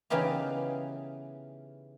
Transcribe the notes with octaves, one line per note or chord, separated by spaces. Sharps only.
C#3 E3 B3 D#4 G4 F5